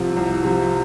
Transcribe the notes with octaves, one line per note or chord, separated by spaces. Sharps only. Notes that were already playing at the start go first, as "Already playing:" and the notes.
Already playing: C2 C3 F3
C2
C3 F3